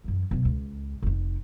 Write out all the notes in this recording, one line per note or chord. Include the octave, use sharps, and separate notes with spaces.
F#2 E3
B1 B2
C#2
F1 D#4